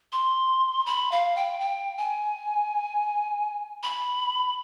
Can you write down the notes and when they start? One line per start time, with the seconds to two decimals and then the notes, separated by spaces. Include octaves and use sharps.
0.12 C6
0.86 B5
1.11 F5
1.36 G5
1.60 G5
1.97 G#5
3.83 B5